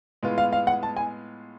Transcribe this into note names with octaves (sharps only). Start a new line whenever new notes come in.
A2 G#3 B3 F4
F5
F5
F#5
A5
G#5